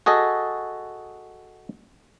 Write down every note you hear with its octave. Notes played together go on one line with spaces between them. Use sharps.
F#4 G#4 A4 D#5